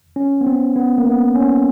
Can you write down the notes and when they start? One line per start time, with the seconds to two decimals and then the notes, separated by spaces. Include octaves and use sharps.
0.16 C#4
0.41 B3
0.47 C4
0.76 B3
0.98 A#3
1.06 B3
1.35 C#4